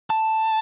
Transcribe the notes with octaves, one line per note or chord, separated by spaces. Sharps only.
A5